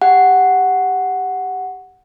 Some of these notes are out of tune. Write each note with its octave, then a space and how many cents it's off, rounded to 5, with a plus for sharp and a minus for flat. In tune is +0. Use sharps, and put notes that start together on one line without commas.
G4 +15 F#5 +0